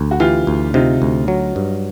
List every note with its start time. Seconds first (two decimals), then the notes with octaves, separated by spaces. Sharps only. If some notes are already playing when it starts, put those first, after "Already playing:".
Already playing: D2
0.11 F#4
0.20 E3 F4 G4
0.47 D2
0.74 C3 D#4 F4
1.02 D2
1.28 F#3
1.56 G2